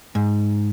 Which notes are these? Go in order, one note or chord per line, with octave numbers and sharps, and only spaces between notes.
G#2